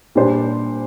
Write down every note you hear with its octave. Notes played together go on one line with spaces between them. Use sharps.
A#2 G3 D4 G4 C5